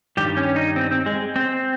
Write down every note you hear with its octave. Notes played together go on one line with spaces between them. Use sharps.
G2 D#3 G3 G4
C#4
D#4
C4
C4
G#3
C4